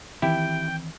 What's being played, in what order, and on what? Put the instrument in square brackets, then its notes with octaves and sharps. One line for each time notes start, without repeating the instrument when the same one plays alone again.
[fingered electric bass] D#3 E3 C4 [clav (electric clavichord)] E4 G4 [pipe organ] G5